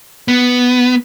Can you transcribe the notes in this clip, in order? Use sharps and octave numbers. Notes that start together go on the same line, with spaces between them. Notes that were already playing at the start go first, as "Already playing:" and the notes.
B3